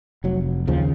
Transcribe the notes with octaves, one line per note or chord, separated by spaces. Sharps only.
F1 F#3
D#2 C#3 F3